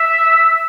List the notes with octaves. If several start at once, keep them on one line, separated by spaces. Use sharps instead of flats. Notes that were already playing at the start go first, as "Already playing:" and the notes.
Already playing: E5